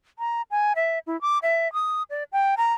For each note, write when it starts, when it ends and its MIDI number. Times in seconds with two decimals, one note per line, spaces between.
0.19 0.42 82
0.51 0.73 80
0.76 0.99 76
1.07 1.19 64
1.21 1.38 86
1.42 1.72 76
1.73 2.03 87
2.10 2.23 74
2.32 2.55 79
2.57 2.74 82